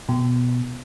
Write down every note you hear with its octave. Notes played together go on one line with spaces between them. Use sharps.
B2